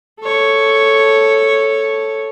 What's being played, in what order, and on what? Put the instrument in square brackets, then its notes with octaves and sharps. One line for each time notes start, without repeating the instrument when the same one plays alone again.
[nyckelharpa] A4 C#5